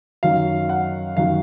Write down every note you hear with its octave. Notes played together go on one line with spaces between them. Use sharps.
F#2 D#3 F#3 F5
F#5
F#2 D#3 F#3 F5